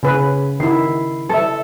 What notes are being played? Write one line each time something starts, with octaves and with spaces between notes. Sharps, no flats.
C#3 C#4 B4
D#3 E4 C7
A4 E5